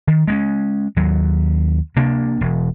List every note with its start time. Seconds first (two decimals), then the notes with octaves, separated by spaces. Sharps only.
0.07 D#3
0.28 G#3 B3 C#4
0.96 D#2 F#3
1.96 C3 A#3 D4
2.41 E1